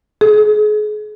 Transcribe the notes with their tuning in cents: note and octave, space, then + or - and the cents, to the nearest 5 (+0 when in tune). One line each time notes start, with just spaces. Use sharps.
G#4 +35